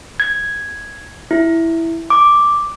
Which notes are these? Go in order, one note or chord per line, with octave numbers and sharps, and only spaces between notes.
G#6
E4
D6